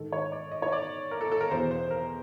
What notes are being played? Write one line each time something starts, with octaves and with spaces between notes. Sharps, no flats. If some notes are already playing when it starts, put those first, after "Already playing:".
Already playing: G#2 D#3 A4
C#5
D5
D#5
C#5
D5
A#4
A4
A4
A#4
E2 B2 C5
C5
A#4